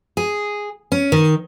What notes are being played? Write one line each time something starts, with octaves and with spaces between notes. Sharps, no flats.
G#4
C#4
D#3